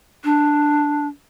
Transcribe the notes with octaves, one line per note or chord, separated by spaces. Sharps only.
D4